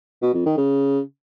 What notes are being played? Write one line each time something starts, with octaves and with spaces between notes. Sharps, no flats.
B2
F2
D#3
C#3